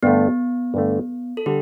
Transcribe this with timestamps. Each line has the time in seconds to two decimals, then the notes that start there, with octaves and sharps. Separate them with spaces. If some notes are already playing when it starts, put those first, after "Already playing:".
0.03 G2 D3 A3 B3
0.74 G2 D3 A3
1.37 A4
1.46 D3 G3 G4